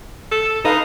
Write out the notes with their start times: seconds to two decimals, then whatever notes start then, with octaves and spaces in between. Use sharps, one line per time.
0.31 A4
0.64 D#4 A4 B4 F5